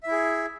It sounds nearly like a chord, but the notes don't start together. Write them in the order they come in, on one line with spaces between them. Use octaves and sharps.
E5 E4 G#4